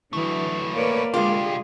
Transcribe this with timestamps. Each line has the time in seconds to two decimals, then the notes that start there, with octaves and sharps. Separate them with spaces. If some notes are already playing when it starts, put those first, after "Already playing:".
0.13 D3 E3 F#3 A3 B3
0.73 A#3 B4 C#5 D5
1.14 C2 D3 G#3 F4 G4 G#4